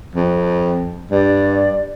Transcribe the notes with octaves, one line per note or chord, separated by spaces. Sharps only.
F2
G2 D5